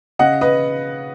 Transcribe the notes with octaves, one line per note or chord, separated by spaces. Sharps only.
C#3 D#5 F#5
B4 D#5